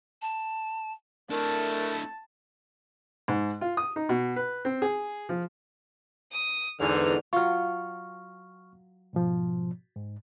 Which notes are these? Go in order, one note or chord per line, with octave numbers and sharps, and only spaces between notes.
A5
A3 D4 E4 A#4 A5
G#2
F4
D#6
D#4
B2
B4
C4
G#4
F3
D#6
E2 G#2 D3 D#4 F6
F#3 F4 C#6 F6
G#2 B2 F3
G#2